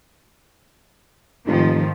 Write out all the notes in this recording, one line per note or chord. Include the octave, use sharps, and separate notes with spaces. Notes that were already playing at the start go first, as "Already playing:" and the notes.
F1 G#2 D#3 F3